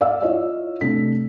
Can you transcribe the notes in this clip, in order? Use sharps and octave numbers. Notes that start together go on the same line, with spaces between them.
D5 E5 F5 E6
E4 F4 C#5 D#5 F5
C3 A3 D4 B6